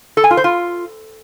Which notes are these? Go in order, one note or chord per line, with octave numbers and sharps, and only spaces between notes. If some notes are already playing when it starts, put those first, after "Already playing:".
A4
G#5
F4
C5
F4